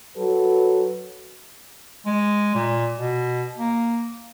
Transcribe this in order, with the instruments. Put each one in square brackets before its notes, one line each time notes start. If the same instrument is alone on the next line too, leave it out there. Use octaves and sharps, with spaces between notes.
[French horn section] F#3 F#4 A4 B4
[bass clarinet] G#3
A#2
B2
A#3